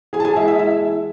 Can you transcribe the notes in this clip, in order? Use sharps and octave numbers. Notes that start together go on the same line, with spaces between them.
E3 G#4 G#5
A5
G#4 G#5
G#3 E4 E5
E4 E5
G#3 E4 E5
E3